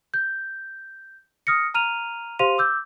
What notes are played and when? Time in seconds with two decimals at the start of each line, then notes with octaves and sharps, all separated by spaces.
0.14 G6
1.47 D#6 F6 A#6 C#7
1.74 A#5 F6 D#7 F7
2.39 G4 C5 F5 C6 D#7 F7
2.58 D6 E6 G6